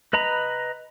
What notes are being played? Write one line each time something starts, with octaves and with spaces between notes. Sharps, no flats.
B4 D#5 A#5 B5